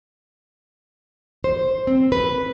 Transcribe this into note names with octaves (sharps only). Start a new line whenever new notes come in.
C5
C4
B4